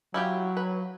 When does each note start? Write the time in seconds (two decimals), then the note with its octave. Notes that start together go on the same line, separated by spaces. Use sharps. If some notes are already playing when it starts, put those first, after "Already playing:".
0.14 F#3 E4 F4 G4
0.57 B4